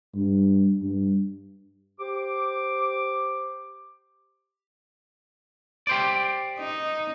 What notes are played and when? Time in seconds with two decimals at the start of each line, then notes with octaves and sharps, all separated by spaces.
0.15 G2
0.82 G2
2.00 G4 C5 D6
5.87 G4 C5 D5
6.59 D#4